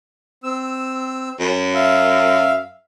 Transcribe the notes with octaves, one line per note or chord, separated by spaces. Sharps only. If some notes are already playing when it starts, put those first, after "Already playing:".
C4 E6
F#2
E5 F5